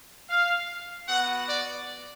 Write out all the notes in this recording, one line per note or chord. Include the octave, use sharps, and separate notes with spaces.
F5
B3 F#4 F#5
D5